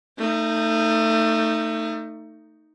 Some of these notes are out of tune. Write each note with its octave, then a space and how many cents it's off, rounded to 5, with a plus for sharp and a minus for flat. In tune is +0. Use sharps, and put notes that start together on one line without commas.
A3 +30 D#4 +0